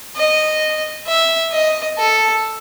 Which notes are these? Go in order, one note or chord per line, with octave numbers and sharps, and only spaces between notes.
D#5
E5
D#5
A4